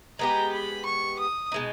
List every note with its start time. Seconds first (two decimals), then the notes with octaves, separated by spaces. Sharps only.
0.19 G#3 B3 G4 A#5
0.52 B5
0.85 C#6
1.19 D#6
1.52 B2 G#3 D#4